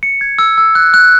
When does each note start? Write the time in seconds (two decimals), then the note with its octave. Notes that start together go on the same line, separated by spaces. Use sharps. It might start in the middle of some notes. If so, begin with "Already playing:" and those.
0.03 C#7
0.21 G#6
0.39 E6
0.58 E6
0.75 F#6
0.94 F#6